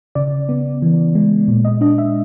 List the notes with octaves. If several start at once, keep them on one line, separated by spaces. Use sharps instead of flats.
C#3 D5
B3
E3
G#3
A#2
D#5
D4 D#5
E5